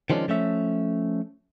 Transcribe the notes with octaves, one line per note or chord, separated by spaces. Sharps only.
D#3 F3 G#3 C#4 D4
F3 A3 C#4 E5